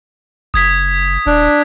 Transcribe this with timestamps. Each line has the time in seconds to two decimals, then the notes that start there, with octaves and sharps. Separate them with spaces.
0.54 F#1 D#6 G#6 B6
1.26 D#1 D4